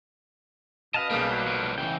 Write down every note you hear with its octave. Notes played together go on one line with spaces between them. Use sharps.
F#2 B4 D#5 F5 A5
B1 C#3 G3 A#3
F#3
F3 G3
C#3 E3 G5